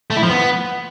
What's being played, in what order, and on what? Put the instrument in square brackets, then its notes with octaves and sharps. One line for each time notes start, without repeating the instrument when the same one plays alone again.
[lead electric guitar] A3
E4
F3
B3